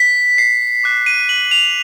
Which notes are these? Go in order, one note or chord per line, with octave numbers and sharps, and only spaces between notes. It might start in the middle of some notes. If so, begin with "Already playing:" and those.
Already playing: B6
C7
D6 F#6
D#7
F#7
F7